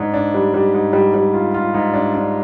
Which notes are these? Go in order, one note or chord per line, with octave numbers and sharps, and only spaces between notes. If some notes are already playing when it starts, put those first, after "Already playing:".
Already playing: G#2 D4
D4
G3
G3
G#2
G3
G3
F4
F4
G#2
D4
D4